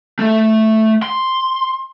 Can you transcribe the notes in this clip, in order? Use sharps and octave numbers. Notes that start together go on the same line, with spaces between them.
A3 E5
C6